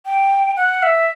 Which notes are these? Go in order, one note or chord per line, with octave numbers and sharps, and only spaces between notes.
G5
F#5
E5